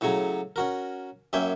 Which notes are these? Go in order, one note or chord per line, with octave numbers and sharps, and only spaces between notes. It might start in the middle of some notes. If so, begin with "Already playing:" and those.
A2 C#3 F#3 G#5 A#5
C#4 F#4 A#4
F#2 A#3 C#4 E5 G5 G#5